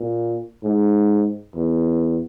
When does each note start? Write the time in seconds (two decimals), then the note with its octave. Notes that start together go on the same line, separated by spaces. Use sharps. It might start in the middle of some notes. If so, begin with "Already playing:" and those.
Already playing: A#2
0.63 G#2
1.55 E2